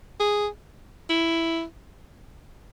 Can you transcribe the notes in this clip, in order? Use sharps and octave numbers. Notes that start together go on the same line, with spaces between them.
G#4
E4